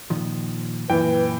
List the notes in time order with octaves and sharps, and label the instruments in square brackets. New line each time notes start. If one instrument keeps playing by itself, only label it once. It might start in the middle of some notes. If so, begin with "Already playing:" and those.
[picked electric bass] A#2 D#3 F3
[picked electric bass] F#2 A#2 [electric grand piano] E3 G5 [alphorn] B4